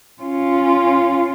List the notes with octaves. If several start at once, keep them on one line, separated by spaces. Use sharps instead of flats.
C#4 F4